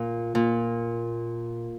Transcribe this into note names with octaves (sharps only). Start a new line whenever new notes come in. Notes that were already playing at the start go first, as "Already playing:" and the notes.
Already playing: A#2
A#2